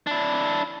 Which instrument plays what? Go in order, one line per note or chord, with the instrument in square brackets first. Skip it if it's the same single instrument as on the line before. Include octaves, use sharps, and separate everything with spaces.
[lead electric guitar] D4 E4